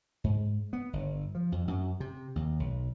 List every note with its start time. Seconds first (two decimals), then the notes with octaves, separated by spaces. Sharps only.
0.24 G#2
0.73 B3
0.93 G1
1.35 F3
1.52 F2
1.68 F#2
2.00 C3
2.36 D#2
2.60 B1